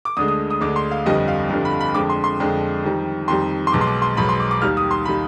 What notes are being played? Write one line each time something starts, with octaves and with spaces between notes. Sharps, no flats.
D6
D2 D3 G#3 D#6
D#6
D#6
D2 D3 G#3 D6
C6
F5
G1 F2 D3 G3 D#5
F5
G1 F2 D3 G3
B5
B5
F2 D3 G#3 D6
C6
C6
F2 D3 G#3
F2 D#3 G3
F2 D#3 G3 C6
C6
B1 B2 G#3 D6
C6
D6
C6
B1 B2 G#3 B5
C6
D6
D6
D#2 D#3 G3 F6
D#6
C6
D#3 G3 B5